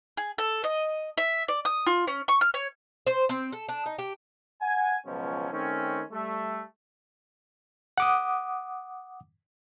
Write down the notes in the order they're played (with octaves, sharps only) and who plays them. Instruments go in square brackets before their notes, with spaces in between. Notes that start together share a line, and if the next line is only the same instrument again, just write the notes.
[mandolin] G#4
A4
D#5
E5
D5
D#6
F4
C#4
C#6
F6
C#5
[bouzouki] C5
C4
A4
D4
D#4
G4
[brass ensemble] F#5 G#5
C#2 B2 F3 F#3 C#4
D#3 A3 C4 C#4
G3 A3
[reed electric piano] F#5 D6 D#6